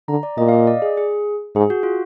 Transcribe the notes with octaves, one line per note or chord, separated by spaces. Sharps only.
D3 A#5
D5
A#2 D#5
F5
D#5
D5
G#4
G#4
G#2 G#4
F#4
F4